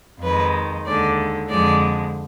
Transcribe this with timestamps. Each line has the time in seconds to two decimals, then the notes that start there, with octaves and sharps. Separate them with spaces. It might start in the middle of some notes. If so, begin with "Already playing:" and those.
0.21 F2 D#3 G#3 B4
0.85 D#2 D3 G#3 D5
1.49 F2 D3 F3 G#3 D5